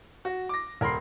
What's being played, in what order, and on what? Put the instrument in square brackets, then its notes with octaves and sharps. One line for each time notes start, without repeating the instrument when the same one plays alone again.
[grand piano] F#4
D6 A#6
D#1 A#4 B5 C6 C7